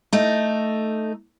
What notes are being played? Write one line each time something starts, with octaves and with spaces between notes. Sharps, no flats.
A3 D#4